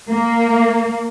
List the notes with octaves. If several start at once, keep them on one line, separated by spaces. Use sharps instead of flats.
A#3